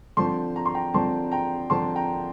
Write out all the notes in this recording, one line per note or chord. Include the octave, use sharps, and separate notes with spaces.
D3 F3 C4 A5 C6
A#5
C6
G5 A#5
D3 F3 C4 A5 C6
G5 A#5
D3 F3 C4 A5 C6
G5 A#5